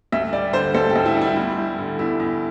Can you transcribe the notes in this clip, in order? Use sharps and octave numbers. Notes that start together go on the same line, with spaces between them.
D2 E5
G3 D5
D3 C5
D2 A4
G4
D2
E4
G3
E4
E2 E4
G3
D3
E2 E4
E2